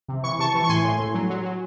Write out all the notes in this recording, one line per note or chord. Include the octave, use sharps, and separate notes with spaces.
C3
E3 C#6
C3 A5 C#6
E3
C#6
A2 G#5 C6
A2
A2
F#3
F#3
F#3